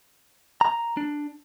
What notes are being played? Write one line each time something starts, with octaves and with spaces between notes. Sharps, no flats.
A#5
D4